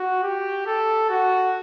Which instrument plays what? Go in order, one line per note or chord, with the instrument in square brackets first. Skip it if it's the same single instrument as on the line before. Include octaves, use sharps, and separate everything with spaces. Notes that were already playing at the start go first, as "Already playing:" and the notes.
Already playing: [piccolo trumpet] F#4
G4
A4
F#4